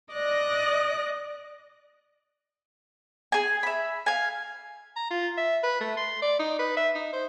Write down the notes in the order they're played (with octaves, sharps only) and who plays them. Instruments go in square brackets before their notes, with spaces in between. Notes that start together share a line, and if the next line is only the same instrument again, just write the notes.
[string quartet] D5 D#5 F#6 A#6
[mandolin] G#4 G#5
E5 B5
F5 G#5
[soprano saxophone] A#5
F4
E5
B4
A3
C6
D5
D#4
B4
E5
D#4
C5